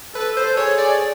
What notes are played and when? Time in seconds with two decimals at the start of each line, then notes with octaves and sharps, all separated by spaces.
0.15 A4 B4
0.37 C5
0.57 G#4 C#5
0.78 D5